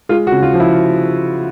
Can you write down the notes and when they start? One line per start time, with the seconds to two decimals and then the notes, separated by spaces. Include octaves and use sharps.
0.09 G#3 F4
0.27 F#4
0.31 C#3
0.43 F4
0.54 F3
0.60 E4